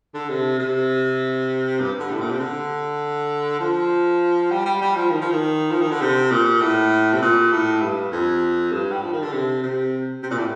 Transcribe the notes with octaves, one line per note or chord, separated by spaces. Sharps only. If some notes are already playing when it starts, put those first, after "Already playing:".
D3
C3
C3
G2
D3
A2
A#2
C3
D3
F3
G3
G3
G3
F3
D#3
F3
D#3
F3
D#3
D3
C3
A#2
A2
C3
A#2
A2
G2
F2
G2
G3
F3
D#3
D3
C3
C3
C3
A#2
A2